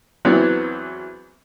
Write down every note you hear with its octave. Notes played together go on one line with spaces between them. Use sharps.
E2 E3 F#3 B3 C4